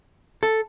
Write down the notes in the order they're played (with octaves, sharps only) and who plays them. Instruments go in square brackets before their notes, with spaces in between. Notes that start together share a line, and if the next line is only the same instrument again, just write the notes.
[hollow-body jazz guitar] A4